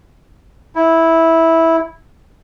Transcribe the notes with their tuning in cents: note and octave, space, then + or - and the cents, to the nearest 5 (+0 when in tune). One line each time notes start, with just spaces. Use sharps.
E4 -10